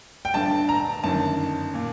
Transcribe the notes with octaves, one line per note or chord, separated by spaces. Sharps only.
G5
G1 G2 D3 A5
A#5
G1 F#2 D#3 A5
A#2